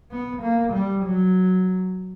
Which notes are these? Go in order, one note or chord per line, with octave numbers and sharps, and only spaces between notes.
B3
A#3
G3
F#3